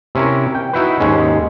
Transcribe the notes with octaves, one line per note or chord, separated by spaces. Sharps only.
C3 C#4 E4 A#4
G5
D#4 E4 F#4 B4
D#2 G#2 G#3 C#4